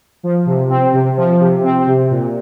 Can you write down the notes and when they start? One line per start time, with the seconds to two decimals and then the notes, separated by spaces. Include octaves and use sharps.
0.23 F3
0.46 C3
0.69 C4
0.93 C3
1.17 F3
1.40 C3
1.64 C4
1.87 C3
2.11 A#2